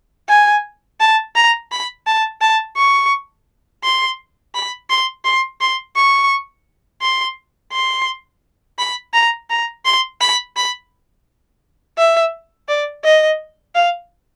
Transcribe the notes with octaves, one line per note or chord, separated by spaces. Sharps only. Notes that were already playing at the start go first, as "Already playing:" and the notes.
G#5
A5
A#5
B5
A5
A5
C#6
C6
B5
C6
C6
C6
C#6
C6
C6
B5
A#5
A#5
C6
B5
B5
E5
D5
D#5
F5